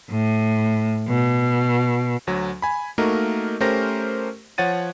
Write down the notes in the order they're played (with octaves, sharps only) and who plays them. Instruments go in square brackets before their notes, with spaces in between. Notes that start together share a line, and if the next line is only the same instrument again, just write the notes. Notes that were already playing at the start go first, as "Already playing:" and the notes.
[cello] A2
B2
[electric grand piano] D2 F#3
G#5 B5
A3 A#3 D#4 F#4 A#4 D#5
A3 C#4 G4 A#4 C5 A#6
F3 C#5 F#5 A6 D#7